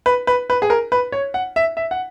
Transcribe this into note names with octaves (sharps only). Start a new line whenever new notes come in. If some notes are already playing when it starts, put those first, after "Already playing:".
B4
B4
B4
G#4
A#4
B4
C#5
F#5
E5
E5
F#5